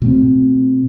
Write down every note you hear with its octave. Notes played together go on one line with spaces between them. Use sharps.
B2 A3 C4